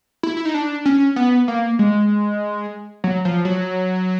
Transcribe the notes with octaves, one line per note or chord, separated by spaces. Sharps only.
E4
E4
D#4
D4
C#4
B3
A#3
G#3
F#3
F3
F#3